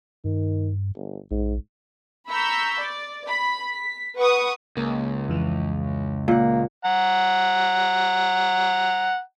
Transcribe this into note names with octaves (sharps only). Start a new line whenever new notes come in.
G2 D#3
G1
A#1 G#2
A#5 B5 C#6 E6 G6 B6
D5
B5
B6
B4 F#5 C#6 D#6
C#2 A#3
F2 E3
A#2 A#3 F#5
F#5 A#5